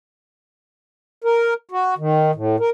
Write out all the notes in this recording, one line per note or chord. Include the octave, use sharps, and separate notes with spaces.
A#4
F#4
D#3
A2
A#4